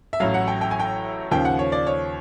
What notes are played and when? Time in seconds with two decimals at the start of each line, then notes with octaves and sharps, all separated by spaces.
0.13 E5
0.20 A1 A2 F#3 F5
0.34 F#5
0.48 G5
0.61 G5
0.71 G#5
0.80 G5
1.31 D#2 C#3 F3 G5
1.45 F#5
1.59 C#5
1.72 D5
1.87 C#5